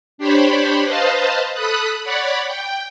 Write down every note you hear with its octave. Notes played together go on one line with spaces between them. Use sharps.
D4 G4 C5 C#5 B5
B4 C5 D#5 F5 A5
A4 B5 D#6 F#6
C#5 D5 F#5 B5
G5